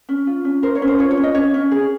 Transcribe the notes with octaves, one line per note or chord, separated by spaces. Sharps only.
C#4
F4
C#4
A#4 C5
C#5
C#4
C5
F4 C#5
C#5
C#4
D#5
C#4 C#5
C#4
G#4